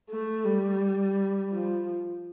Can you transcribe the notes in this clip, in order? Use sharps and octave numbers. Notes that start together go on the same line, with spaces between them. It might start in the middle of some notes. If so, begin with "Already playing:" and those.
A3
G3
F3